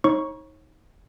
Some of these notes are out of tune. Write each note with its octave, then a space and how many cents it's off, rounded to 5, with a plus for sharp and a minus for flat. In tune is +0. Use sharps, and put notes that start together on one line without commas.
D#4 +20 C#5 -40 C#6 +0